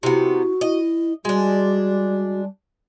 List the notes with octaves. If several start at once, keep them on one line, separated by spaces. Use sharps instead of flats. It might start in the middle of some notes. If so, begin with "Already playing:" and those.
C3 B3 E4 F#4
E4 D#5
G3 G#3 D4 F#4